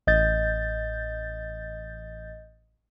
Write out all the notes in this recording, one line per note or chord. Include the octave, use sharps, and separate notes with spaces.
A1 D#5 G6 A6